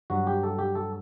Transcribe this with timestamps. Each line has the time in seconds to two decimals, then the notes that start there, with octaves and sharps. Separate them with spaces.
0.10 G2 F#3 F#4
0.27 G4
0.43 A4
0.59 G4
0.75 A4